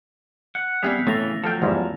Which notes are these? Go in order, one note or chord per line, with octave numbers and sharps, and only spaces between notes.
F#5
G3 B3 C4 G#4 E5 F7
A2 C#3 E3 A3 A#6 F7
F3 F#3 A4 F5 G5
E2 G#2 G3